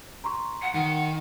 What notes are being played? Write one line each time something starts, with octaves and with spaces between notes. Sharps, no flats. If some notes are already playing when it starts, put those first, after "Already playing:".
A#5 C6 C#6
F#5
D#3 F#5